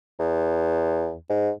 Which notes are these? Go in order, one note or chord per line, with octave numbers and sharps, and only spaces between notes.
E2
G#2